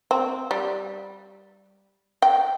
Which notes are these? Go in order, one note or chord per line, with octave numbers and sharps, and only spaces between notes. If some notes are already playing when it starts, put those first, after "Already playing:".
C4
G3
G5